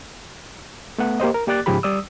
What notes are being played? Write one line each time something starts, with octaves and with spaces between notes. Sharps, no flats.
A3 B3 F#5
A#3 G4 C5 D#5
A#4
A#3 G4 D5 D6 F#6 A6
G#2 C#3 F3 G4 G#4 B5
G3 D5 D#6 E6